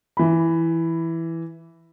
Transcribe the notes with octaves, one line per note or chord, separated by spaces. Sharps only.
E3 B5